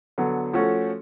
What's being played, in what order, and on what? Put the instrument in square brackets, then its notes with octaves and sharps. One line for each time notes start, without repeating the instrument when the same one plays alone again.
[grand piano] D3 F#3 B3
F3 A3 C#4 F#4 A4